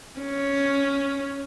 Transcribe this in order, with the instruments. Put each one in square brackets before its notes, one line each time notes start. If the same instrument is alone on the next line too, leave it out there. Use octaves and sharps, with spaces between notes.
[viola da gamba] C#4